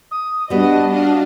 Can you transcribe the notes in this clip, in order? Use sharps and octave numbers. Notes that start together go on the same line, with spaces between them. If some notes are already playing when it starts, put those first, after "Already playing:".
D#6
G3 B3 D4 F#4 D#5
D4 D#5 F5